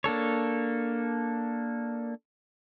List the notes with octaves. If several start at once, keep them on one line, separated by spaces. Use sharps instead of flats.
A#3 D4 A4 C#5